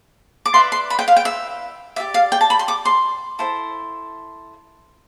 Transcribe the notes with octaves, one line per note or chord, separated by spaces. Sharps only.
D6
E4 B4 D5 C6
C6
B5
G5
F5
G5
E5
G4 D5 E5
F5
G5
A5
B5
C6
D6
C6
E4 A4 C5